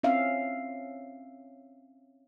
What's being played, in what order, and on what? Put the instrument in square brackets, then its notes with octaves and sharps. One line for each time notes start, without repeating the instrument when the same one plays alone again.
[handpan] C4 C#4 E5 F5